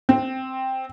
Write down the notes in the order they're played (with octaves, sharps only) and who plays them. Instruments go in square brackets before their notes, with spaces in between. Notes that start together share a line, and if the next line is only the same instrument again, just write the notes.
[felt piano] C4